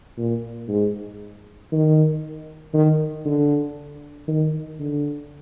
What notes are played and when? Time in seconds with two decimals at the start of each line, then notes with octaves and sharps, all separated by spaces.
0.18 A#2
0.68 G#2
1.72 D#3
2.74 D#3
3.25 D3
4.28 D#3
4.80 D3